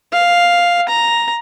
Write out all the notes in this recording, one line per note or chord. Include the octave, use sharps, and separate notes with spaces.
F5
A#5